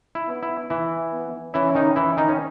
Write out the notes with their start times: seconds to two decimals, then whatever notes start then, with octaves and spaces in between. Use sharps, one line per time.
0.15 E4
0.28 B3
0.43 E4
0.70 E3 E4
1.13 B3
1.54 E3 C#4 E4
1.75 D#3 D#4
1.96 E3 E4
2.17 D#3 D#4
2.29 C#4